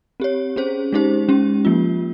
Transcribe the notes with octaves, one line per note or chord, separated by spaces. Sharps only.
C4 G4 C#5
C#4 G#4 C5
G#3 D#4 G4 C5
G#3 C#4 G4
F3 A#3 F4